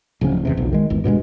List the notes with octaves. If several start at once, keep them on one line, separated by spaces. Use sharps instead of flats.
D1 C#3 F3 C#4
E1 E2 C3
F1 B1 F2
D#3 G#3
G#1 E2
G2 B2 F#3 G#3